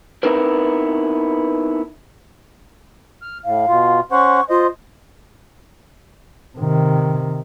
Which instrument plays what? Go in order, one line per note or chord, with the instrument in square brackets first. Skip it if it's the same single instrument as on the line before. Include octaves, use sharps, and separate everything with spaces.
[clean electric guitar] B3 C4 D#4 E4 A#4 B4
[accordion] F6
[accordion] A2 [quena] F5
[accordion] B2 F4
[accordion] C#4 C5 F#5 [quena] C#6
[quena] F4 [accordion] C5 D#5
[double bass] C3 D#3